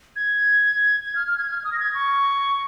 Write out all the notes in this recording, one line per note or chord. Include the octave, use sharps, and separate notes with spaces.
G#6
G#6
F6
F6
G#6
F6
D#6
A#6
G#6
C#6